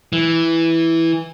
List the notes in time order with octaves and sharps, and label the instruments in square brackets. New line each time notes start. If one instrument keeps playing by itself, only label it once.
[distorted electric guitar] E3